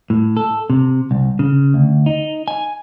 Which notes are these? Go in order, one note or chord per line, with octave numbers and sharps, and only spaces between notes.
A2
A4
C3
C2
C#3
D2
D#4
G#5